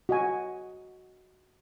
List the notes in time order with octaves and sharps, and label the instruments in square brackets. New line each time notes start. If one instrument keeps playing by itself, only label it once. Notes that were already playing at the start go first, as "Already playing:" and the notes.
[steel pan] F#4 D#5 G#5